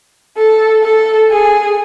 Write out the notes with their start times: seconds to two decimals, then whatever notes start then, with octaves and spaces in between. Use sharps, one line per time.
0.37 A4
0.84 A4
1.31 G#4